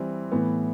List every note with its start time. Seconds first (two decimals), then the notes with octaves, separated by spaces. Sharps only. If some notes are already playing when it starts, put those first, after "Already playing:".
Already playing: E3 G3 C4
0.32 A2 E3 B3